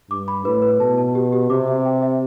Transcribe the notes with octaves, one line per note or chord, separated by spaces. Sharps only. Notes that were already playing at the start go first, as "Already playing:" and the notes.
G2 D6
B5
A2 B4
B4
B2 A5
A5
G4
G4
C3 D6
E5
G5
E5